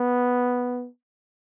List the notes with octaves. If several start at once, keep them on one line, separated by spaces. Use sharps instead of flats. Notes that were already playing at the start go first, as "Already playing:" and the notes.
Already playing: B3